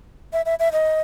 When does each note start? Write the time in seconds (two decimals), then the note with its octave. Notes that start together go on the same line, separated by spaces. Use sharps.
0.33 E5
0.46 E5
0.59 E5
0.72 D#5